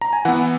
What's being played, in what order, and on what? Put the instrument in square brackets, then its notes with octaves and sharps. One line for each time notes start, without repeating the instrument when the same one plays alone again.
[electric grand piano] A#5
G#5
E3 B3 F#5